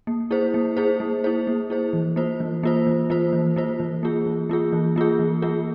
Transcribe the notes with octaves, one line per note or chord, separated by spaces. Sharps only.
A#3
E4 G#4 C5
A#3
E4 G#4 C5
A#3
E4 G#4 C5
A#3
E4 G#4 C5
E3
A#3 F4 C5
E3
A#3 F4 C5
E3
A#3 F4 C5
E3
A#3 F4 C5
E3
A#3 F4 G#4
E3
A#3 F4 G#4
E3
A#3 F4 G#4
E3
A#3 F4 G#4